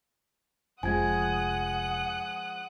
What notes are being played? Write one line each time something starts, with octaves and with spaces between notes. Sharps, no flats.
F1 F3 G#3 F#5 G#5 D#6 F#6 G#6